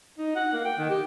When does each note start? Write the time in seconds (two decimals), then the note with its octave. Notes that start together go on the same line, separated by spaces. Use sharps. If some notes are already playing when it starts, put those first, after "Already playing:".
0.19 D#4
0.36 F#5
0.53 A#3
0.65 G5
0.79 D#3
0.90 G4